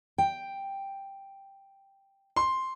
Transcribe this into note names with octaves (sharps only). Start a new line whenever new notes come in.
G5
C6